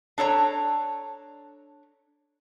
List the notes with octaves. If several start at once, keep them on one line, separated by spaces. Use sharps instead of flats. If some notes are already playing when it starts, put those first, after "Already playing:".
D4 A4 C#5 A#5